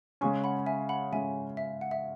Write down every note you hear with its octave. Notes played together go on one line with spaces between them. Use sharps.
C#3 G#3 C#4 G#5 C#6
F#5 B5
E5 G#5
F#5 B5
C#3 G#3 C#4 E5 G#5
E5
F#5
E5